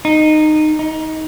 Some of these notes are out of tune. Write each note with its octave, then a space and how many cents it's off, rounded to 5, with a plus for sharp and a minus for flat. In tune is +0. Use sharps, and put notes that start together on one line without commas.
D#4 -15
D#4 +20